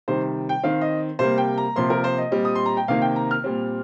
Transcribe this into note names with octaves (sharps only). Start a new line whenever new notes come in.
C3 D#3 G3 C5
G5
D#3 C4 F5
D#5
C3 G3 A#3 C5
G5
A#5
C3 F3 A#3 C6
A#4
C5
D#5
A#2 G3 C4
D#6
C6
A#5
G5
C3 D#3 A#3 F5
G5
A#5
F6
A#2 G3 C4